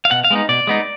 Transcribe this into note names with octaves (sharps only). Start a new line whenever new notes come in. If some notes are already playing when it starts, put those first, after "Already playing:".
F5
B2 F#5
F5
G#3 B3 D#4
B2 D5
G#3 B3 D#4